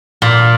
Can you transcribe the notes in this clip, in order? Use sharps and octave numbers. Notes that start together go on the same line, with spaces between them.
A#2